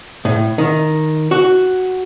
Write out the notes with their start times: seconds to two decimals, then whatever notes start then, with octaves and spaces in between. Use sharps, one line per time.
0.25 A2
0.58 D#3
1.31 F#4